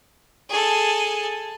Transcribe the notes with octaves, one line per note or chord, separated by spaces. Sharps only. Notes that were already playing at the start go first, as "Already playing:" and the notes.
G#4 A4